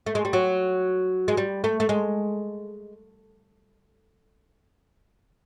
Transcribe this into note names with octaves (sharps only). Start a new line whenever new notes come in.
A3
G#3
G3
F#3
G#3
G3
A3
A3
G#3